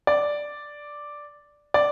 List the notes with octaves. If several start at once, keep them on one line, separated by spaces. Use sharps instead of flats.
D5
D5